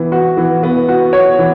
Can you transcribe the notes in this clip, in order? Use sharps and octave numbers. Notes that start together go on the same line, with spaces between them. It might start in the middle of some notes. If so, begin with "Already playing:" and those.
Already playing: E3 B3
F#4
E3
B3
F#4
C#5
E3